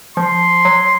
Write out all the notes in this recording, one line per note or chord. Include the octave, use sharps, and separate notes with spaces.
F3 C6
F#3